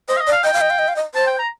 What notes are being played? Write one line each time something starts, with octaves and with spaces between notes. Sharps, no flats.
C5 D#5
F5
D#5
D5
F5
D#5 G5
F5
D#5
F5
D#5
F5
D#5
C5 A5
G5
A#5